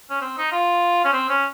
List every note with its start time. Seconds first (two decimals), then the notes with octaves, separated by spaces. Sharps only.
0.10 C#4
0.21 C4
0.38 D#4
0.52 F4
1.04 C#4
1.13 C4
1.29 C#4